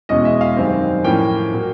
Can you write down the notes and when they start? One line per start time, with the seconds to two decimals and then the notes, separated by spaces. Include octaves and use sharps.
0.09 E2 B2 G#3 C#4 D#5
0.25 E5
0.41 F5
0.57 F#2 D#3 G3 C4
1.04 A2 F3 A#3 C#4 G5
1.53 A#2 F#3 A#3